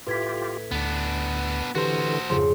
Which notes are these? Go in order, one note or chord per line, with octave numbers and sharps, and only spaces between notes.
A2 F4 G4 B4 G#6 B6
D2 B3 D4
D3 E3 F#4 G4 B4 C5 C6
F2 G#2 C#3 F3 C6